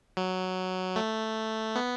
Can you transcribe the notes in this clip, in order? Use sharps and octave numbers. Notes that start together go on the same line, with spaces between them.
F#3
A3
B3